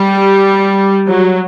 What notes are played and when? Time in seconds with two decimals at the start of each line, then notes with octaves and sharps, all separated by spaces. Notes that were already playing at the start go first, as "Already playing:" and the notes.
Already playing: G3
1.07 F#3